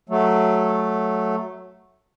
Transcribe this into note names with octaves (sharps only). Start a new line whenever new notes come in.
F#3 A3